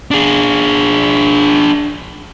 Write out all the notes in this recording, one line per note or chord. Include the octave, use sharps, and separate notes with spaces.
D4 G#4